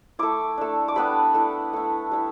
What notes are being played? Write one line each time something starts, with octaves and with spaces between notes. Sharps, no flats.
A3 E4 D6
A3 D4
D6
G3 B3 D4 B5
A3 E4
A3 E4
G3 E4